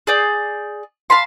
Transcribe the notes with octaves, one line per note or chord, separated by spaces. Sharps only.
G#4 D5 G6
F5 A5 B5 C6